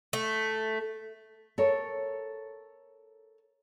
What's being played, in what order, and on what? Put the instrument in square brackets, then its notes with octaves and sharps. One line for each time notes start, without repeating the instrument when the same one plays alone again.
[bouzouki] A3
[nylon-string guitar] A4 A#4 C#5